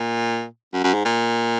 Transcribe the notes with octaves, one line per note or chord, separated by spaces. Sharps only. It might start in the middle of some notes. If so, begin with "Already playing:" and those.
Already playing: A#2
F#2
F#2
G#2
A#2